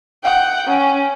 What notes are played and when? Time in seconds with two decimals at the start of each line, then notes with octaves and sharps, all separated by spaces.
0.23 F#5 G5
0.67 C#4